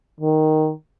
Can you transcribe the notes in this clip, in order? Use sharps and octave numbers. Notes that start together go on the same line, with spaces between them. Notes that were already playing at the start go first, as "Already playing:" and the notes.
D#3